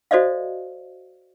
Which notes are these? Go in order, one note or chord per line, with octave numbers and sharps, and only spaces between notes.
F#4 A4 C5 D5 D#5 F5